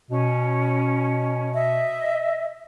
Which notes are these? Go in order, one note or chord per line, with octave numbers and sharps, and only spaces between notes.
B2 C#4
D#5 E5